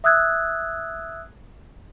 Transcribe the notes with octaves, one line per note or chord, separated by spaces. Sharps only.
E5 D#6 E6 F#6 G#6